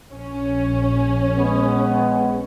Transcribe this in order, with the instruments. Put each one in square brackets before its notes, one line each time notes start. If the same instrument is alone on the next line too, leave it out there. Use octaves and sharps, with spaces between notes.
[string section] A#1 C#4
[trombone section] G#3 B3